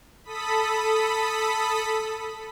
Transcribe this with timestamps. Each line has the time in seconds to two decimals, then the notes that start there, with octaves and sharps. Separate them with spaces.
0.24 A4 B5 D#6 B6